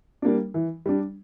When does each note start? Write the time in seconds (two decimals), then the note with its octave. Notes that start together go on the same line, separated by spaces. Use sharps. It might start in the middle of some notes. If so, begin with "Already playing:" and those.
0.22 G3 A#3 D4
0.54 E3
0.86 G3 D4